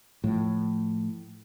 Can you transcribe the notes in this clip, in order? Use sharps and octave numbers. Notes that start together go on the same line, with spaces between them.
A2 F3